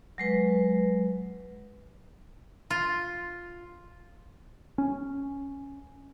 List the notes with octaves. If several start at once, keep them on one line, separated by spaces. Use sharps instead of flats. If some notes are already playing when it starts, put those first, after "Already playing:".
F#3 G#3 B4
F4
C#4